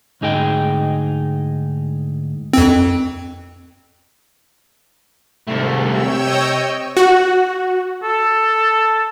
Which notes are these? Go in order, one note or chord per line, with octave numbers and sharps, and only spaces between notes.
D2 G#2 D#4 G#4 D#5 G5
F2 C4
C2 G#2 A3
C3 C#5 G5 E6
D#5
F#4
A4